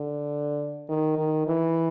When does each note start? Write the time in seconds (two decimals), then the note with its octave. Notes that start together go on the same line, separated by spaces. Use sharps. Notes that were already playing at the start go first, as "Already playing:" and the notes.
Already playing: D3
0.89 D#3
1.18 D#3
1.47 E3